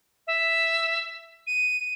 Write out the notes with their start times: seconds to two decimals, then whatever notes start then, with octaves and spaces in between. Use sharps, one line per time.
0.27 E5
1.47 D#7